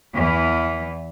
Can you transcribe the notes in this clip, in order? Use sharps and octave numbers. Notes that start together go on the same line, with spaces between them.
E2 E3